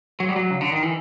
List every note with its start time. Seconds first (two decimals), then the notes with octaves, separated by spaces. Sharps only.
0.20 F#3
0.29 G3
0.36 F#3
0.51 C#3
0.61 D3
0.72 D#3
0.83 E3